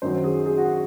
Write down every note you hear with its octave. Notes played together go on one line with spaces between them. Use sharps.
F#2 D#3 F#3 C5
G#4
G#4
F#4